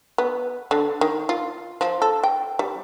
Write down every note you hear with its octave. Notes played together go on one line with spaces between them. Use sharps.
B3
D3
D#3
F4
F3
A4
G5
G3